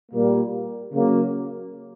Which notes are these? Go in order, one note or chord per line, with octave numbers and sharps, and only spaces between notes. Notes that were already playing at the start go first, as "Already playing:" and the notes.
A#2 G3 A#3
C#3 F#3 A#3